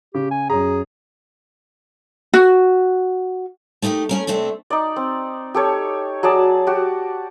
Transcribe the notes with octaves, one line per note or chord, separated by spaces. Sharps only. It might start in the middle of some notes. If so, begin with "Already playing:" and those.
C#3 G4
G#5
F#2 G#4 A#5
F#4
A3 D#4 E4 G4 A#4
A3 C#4 A#4
C3 A3 C4 D4 A4
D#4 D5
C4
G4 A4 C#5
F#3 G#4 D5 A5
F#4 G4